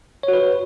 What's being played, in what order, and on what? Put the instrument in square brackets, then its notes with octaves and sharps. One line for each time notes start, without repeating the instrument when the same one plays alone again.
[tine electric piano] C#5
F#4
B4